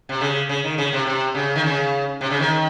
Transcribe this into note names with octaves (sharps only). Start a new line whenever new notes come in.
C3
C#3
C#3
D#3
C#3
C3
C3
C#3
D#3
C#3
C3
C#3
D#3